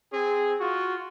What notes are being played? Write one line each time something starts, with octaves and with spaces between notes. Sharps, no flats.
C4 G#4
F4 F#4